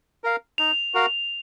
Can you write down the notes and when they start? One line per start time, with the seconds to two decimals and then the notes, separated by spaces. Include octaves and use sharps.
0.24 A#4 F5
0.58 D#4 F7
0.94 F#4 A#4 F5